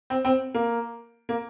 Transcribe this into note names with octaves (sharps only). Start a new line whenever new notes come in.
C4
C4
A#3
A#3